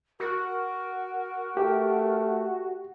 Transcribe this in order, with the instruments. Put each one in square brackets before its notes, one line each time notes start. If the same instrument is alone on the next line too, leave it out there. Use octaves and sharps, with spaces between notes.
[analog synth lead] F#4 [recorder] A#4
[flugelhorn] A3 [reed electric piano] G4